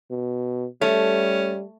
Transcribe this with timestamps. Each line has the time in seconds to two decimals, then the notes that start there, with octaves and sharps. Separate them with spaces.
0.11 B2
0.81 G3 A3 C#4